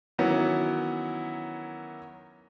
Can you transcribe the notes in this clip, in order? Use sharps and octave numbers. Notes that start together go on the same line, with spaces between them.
D#3 E3 F#3 B3 C#4 E4